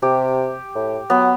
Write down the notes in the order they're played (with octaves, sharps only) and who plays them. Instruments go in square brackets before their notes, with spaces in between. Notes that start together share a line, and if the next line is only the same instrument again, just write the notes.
[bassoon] C3 [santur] G4
[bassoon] A2
[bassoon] F#3 [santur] B3